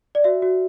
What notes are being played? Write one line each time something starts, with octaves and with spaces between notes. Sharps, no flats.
D5
F#4 E5
F#4